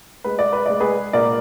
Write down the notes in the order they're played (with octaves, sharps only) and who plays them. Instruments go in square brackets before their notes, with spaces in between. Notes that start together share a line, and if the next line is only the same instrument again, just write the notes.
[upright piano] G#3 B4
D5
B4
G#3 D5
G#4 B4
A#2 A#4 D5